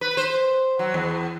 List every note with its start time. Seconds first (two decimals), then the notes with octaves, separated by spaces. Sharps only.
0.01 B4
0.17 C5
0.79 F#3
0.94 E2